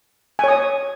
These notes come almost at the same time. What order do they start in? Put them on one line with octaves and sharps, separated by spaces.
G#5 C#5 D#6